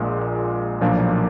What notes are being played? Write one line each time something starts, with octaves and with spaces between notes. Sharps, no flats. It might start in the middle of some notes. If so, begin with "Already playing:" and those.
Already playing: A#1 A#2 G#3
B1 A#2 F3 A#3 D4